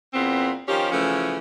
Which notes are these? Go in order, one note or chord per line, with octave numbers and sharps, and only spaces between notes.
E2 A#2 B3 C4
D#3 F3 C#4 G4
C#3 E3 F3 A3 C#4